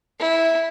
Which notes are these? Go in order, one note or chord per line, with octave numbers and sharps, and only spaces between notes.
E4